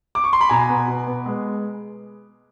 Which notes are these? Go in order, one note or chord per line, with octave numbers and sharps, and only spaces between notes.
D6
C#6
C6
B5
B2 G#5 A#5
B3
B2
B3
G#3